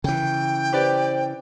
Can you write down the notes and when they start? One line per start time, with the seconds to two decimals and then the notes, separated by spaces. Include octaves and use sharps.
0.04 C#3 E3 G5
0.73 G4 B4 C5 D5